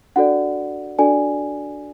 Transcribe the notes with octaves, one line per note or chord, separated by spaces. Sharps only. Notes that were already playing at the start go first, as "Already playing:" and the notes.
D4 F#4 A4 D5 F#5
D4 F#4 A4 D5 G#5